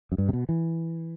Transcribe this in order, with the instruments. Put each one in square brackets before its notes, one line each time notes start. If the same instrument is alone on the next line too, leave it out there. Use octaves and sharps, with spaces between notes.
[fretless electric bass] F#2
G2
C3
B2
E3